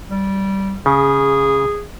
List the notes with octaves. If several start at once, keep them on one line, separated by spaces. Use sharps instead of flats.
G3
C#3 G#4